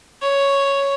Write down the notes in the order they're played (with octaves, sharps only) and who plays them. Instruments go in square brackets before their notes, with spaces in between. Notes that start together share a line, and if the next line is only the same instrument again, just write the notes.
[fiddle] C#5